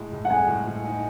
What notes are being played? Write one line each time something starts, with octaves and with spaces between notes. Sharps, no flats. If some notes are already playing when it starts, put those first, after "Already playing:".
Already playing: A2 G#3 E4
A2
F#5
G#3 G#5
A2
A2
D#4